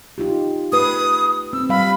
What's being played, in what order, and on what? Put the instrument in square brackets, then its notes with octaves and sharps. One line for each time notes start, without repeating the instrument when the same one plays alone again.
[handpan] D#4 F4 G4
[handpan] A3 B4 [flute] D#6
[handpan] C4 [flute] E6
[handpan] G3 F5 [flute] B5